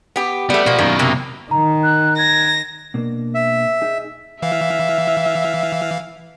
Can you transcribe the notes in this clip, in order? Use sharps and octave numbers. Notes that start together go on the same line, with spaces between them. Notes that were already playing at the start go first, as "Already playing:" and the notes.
B3 G4
G3 A3 B3
F3 A#3 B3 F#4
F#2 B2 D#3 A#3
C3 A#3
D#3 A#5
F#6
G#6 A#6
B2 A#3 D4
E5
D#4 G#4
E3 E5 F5